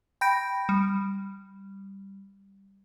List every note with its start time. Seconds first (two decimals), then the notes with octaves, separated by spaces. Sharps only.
0.21 G5 B5 G6 A#6 D7
0.69 G3